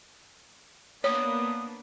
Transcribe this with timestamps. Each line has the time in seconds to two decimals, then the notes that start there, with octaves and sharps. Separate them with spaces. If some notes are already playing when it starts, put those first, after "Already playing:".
1.04 A#3 B3 D4 C#5 D#6